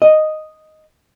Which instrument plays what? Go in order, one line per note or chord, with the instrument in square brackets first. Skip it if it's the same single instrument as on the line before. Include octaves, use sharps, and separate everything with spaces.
[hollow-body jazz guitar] D#5